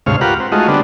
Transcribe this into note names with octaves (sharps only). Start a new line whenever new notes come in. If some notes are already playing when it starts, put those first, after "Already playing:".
D2 G#2 C3 C#5 F5
F4 G4 A#4 B4 F#5
C4
G#3 A3 D#4 F4 F#4
D3 G3 B3 C4 D4